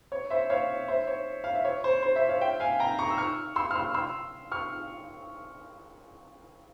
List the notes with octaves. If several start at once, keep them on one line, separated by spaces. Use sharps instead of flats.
C#5
C5 E5
C#5 F5
C5 E5
C#5
F5
E5
C#5
C5
C5
C5 E5
C#5 F5
E5 G5
F5 G#5
G5 A#5
A#5 C#6
E6
C#6 F6
C6 E6
F6
C6 E6
C6 E6
C#6 F6